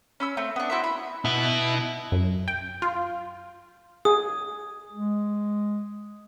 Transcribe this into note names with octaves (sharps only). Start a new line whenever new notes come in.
C#4 B5 E6
A3 C4
B3 D4
E4 F#4 C5 E5
B5
B2 B3 E4
F#2
G5
F4
G#4 D#6
G#3